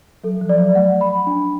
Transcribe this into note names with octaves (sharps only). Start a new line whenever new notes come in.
F#3 A4
F3
D5
F#3
A3 F#5
B5
D4